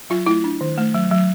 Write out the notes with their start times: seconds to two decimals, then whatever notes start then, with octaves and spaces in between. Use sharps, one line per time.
0.10 F#3 F4
0.26 A3 E4
0.44 D4
0.61 D#3
0.78 A3
0.94 F#3
1.11 F#3